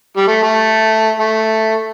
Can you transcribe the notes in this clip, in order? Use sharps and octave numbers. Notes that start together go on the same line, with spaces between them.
G3
A3
A3
A3